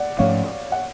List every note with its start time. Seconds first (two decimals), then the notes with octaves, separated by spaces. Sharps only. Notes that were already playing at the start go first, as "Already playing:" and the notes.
Already playing: D5 F#5
0.18 G#2 F3 A3 C#4 C#5 F5
0.72 F#5